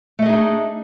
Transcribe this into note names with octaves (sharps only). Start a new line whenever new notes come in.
A3 D4 D#4 G#4 D#5